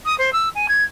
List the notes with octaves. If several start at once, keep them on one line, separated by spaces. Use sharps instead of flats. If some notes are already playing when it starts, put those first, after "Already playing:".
D#6
C5
E6
G#5
G#6